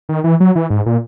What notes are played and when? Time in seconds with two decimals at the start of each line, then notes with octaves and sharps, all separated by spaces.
0.09 D#3
0.24 E3
0.40 F#3
0.56 E3
0.70 G#2
0.86 A#2